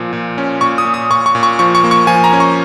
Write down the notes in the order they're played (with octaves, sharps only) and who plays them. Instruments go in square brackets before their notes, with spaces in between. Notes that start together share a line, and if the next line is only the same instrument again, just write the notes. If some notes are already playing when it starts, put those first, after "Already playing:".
Already playing: [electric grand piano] A#2 F3
A#2
C#4
A#2 C#6
D#6
A#2
D#6
A#2 C#6
C#6
A#2
C#6
F3 C#6
C#6
A#3
C#6
F3 G#5
A#5
C#4
C#6